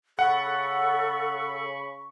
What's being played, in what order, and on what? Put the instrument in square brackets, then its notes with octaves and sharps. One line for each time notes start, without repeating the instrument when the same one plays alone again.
[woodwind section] C#3 B5 C#6 [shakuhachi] A4 [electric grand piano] F#5